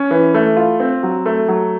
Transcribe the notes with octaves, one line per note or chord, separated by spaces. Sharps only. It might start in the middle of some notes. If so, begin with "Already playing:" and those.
Already playing: C#4
E3
A3
F4
C4
F#3
A3
F#3